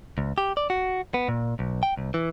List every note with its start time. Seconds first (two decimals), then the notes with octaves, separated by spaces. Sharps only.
0.18 C#2
0.38 G4
0.57 D5
0.70 F#4
1.14 B3
1.29 A#2
1.59 B1
1.83 G5
1.97 C2
2.14 E3